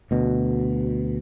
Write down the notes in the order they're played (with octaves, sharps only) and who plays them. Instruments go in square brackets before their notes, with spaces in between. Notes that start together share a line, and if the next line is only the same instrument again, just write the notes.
[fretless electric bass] D2 B2